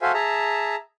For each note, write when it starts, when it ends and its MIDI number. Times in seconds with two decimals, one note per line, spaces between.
0.02 0.12 66
0.02 0.12 69
0.02 0.12 72
0.02 0.12 76
0.02 0.12 77
0.02 0.12 80
0.14 0.75 68
0.14 0.75 76
0.14 0.75 81
0.14 0.75 82